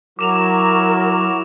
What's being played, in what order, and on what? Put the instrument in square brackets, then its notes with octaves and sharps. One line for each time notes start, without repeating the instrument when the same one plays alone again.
[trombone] F#3 [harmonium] E4 F#4 [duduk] A#4 [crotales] D6 E7 F7